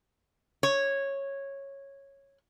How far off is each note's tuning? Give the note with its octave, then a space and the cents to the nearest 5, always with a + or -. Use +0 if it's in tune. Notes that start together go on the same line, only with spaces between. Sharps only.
C#5 -10